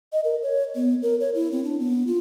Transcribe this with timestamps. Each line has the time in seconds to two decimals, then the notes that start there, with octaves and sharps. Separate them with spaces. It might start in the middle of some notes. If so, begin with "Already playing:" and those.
0.13 D#5
0.24 A#4
0.43 C#5
0.75 B3
1.02 A#4
1.20 C#5
1.35 E4
1.52 C4
1.64 D4
1.80 B3
2.07 F4